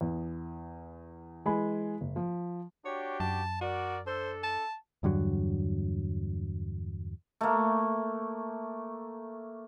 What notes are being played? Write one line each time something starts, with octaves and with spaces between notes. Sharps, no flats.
E2
E3 G#3 G#5 B5
F#1
F3
D4 F#4 G4 C#5
F#2 A5
F#4 A#4 D5
D4 A4 C5
A5
E2 G2 D3 F#3
A3 A#3